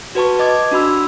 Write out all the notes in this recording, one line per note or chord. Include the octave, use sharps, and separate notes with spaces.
F#4 B4 A5 C#6
D#5 D6 G#6
D4 F#4 B5 E6